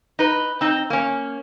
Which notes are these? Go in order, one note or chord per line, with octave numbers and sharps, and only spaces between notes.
D#4 B4
C4 D#4
A#3 C#4